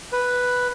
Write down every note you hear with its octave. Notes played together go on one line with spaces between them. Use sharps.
B4